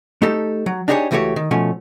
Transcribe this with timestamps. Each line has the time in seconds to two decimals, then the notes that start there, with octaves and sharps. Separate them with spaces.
0.22 A3 D#4 G4 A4
0.66 F#3
0.88 D4 D#4 G4 G#4 C5 C#5
1.11 C#2 E3 A3 F#4 G4 C#5
1.36 D#3
1.51 B2 F3 A3 C#4